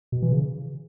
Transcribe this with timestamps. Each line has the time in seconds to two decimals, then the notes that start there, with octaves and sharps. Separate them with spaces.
0.12 B2
0.22 E3
0.32 C#3